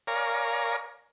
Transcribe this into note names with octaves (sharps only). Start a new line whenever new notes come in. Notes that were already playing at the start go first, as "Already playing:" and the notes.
A#4 C#5 D5 F5 G#5 A#5